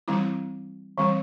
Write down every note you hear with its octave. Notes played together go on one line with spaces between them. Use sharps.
E3 G3 C4 E4
E3 G3 C4